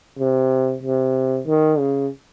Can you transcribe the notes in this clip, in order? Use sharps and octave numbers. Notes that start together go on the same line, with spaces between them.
C3
C3
D#3
C#3